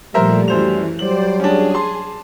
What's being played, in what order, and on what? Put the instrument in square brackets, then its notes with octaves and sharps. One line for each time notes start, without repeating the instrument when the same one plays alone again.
[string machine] A#2 F3 [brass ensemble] G3 A3 [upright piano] A#4 C5 E5
[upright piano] F#2 C5 F7 [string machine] E3
[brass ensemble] F#3 G3 [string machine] C5 D5 [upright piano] F#7
[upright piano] C#4 D4 [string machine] G#4
[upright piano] A5 C6